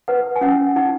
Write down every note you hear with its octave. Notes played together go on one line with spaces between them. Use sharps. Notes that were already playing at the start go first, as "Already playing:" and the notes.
B4 F#5
G#5
C#4 F#5
D#4 F#5